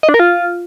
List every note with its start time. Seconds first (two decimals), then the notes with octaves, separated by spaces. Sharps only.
0.03 D#5
0.09 D4
0.14 A#4
0.19 F4